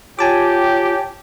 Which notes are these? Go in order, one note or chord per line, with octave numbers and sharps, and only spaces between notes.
F4 G4 C#5 G#5 A5 D6